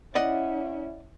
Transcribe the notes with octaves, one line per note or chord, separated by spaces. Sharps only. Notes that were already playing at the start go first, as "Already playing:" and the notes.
C#4 E4 D5 D#5 F#5